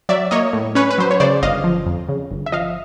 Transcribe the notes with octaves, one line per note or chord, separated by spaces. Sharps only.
F#3 D5 E5
A#3 C#5 D#5
A2
C#4 B4 C#5
B4
F#3 C5
C#5
C#3 C5 D5
G1 D#5 F5
F3
F2
C#3
G1
E5
F3 D#5 F5